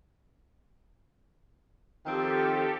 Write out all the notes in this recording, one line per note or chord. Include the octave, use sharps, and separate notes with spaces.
D#3 F3 C4 G4 A4